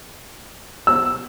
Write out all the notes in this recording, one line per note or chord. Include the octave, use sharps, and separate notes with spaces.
E6